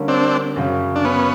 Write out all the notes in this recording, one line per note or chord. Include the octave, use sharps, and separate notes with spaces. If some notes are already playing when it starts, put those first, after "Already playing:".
Already playing: D3 G3 A#3 C#4
C4 D4
F#2 C#3 F#3
D4
B3 C#4